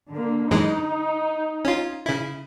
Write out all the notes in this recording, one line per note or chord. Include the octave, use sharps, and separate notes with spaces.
D3 A#3
F#2 E3 G#3 D#4
C#4 F4
C#3 E4